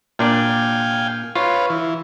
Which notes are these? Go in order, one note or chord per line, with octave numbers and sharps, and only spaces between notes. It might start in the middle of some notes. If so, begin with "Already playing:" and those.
A#2 D4 D5 F5 G5 G#5
F4 B4 C#5 F5
E3